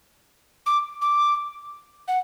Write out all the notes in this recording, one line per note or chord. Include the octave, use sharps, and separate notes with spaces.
D6
D6
F#5